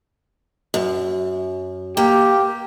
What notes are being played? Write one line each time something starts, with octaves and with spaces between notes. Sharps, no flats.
F#2
A#3 G4